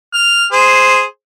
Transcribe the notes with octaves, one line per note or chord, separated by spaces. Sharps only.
F6
G#4 C5